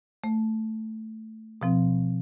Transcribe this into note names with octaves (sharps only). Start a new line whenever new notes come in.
A3
B2 F3 C4